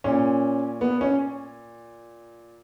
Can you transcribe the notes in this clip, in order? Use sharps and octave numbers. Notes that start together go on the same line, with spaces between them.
A#2 C#4
B3
C#4